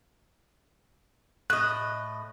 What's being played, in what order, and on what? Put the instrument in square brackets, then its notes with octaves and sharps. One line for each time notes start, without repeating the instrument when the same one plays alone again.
[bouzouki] A2 D#5 [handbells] F#6